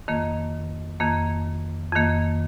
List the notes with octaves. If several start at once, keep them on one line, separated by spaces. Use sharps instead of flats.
F2 D#3 A#3
F2 D#3 A#3
F2 D#3 A#3